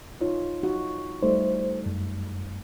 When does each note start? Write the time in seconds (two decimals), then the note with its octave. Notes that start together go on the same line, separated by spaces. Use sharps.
0.21 D#4 F4 C#5
0.63 D#4 F#4
1.23 G3 A3 D#4 C5
1.86 F#2